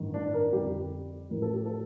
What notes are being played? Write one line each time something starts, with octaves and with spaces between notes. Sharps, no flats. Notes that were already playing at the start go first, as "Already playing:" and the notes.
Already playing: A1 G2 D#3
D4
A#4
F2 D3 G3 G4
A1 A2 F3 A#4
A4
G4
A4